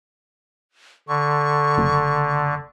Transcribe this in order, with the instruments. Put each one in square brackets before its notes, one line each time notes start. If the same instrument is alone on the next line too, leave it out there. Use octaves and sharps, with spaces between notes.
[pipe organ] D3 [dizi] C#6
[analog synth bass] F#1